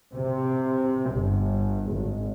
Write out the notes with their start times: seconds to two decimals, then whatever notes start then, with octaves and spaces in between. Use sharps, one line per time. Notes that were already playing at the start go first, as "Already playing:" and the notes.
0.13 C3
1.11 G1
1.90 G#1